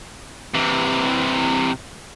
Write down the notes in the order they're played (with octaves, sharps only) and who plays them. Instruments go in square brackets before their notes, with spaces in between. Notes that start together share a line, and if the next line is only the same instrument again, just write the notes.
[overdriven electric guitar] C3 E3